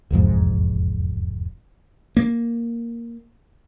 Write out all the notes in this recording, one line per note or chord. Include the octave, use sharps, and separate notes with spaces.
E1 C2 F2 G#2
A#3